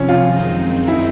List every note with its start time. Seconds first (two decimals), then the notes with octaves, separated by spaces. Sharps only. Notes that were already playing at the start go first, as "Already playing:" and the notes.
Already playing: F2 C3 F3 C#4
0.09 F4
0.25 F#2 D#3 G#3 C4 D#4
0.88 E4